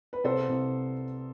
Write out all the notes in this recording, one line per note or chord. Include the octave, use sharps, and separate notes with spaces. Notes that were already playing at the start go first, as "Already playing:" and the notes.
B4
C2 A4 C5
C2